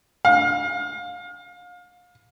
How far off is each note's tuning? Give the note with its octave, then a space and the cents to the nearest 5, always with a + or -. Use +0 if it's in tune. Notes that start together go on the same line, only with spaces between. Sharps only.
F5 +30